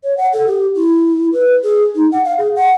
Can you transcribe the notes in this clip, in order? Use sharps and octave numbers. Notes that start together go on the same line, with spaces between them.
C#5
F#5
A4
G4
E4
B4
G#4
D#4
F#5
F5
G#4
F#5